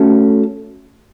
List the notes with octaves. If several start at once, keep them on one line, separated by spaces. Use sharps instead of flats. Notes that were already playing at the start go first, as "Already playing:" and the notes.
Already playing: A3 C#4 F#4 A4